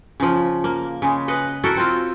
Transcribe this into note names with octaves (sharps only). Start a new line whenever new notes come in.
C#3 F3
A#3
C#3 G#3
B4 D#5 F#5
E4 F#4 A4 A#4
C4 F4